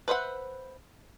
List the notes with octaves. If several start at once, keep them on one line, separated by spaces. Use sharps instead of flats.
B4 C5 E5 F#5